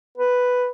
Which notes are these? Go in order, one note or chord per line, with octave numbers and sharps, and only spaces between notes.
B4